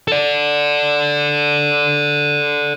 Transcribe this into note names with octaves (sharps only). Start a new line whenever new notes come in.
A4 D5